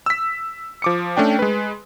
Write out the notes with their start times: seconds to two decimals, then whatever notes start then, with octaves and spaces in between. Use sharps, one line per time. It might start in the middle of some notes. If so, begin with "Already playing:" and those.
0.06 E6 B6
0.82 F3 D6 C#7
1.17 A3 C#4 D4 G5
1.39 G#3 B4